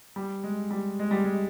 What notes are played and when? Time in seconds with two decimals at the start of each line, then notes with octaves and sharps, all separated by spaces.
0.16 G3
0.44 G#3
0.71 G3
1.00 G#3
1.11 G3
1.24 G#3